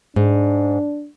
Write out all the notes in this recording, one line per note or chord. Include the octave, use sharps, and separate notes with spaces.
G#2 D4